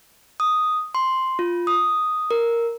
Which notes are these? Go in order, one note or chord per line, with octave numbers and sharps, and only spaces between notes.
D#6
C6
F4
D#6
A#4